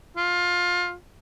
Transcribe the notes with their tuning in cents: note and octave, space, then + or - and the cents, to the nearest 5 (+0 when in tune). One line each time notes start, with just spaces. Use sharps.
F4 +20